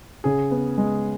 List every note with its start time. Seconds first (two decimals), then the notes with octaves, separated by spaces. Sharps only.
0.24 C#3 G#4
0.51 B3
0.78 G#3